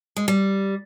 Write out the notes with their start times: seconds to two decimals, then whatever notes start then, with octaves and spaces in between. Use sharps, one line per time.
0.16 G#3
0.28 G3